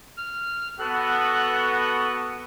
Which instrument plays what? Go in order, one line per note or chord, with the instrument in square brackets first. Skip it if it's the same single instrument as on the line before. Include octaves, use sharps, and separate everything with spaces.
[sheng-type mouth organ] F6
[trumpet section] B3 F#4 [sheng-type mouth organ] A4 F#6